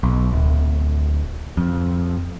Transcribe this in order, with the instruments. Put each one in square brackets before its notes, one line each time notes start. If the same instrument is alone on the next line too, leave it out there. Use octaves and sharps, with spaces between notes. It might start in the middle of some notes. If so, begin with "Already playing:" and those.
[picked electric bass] B1
D1
F2